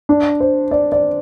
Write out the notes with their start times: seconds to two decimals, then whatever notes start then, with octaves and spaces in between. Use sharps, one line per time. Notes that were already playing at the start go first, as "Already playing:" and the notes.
0.09 D4
0.40 C5
0.71 D5
0.92 D5